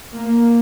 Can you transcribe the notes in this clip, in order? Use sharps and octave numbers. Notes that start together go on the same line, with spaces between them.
A#3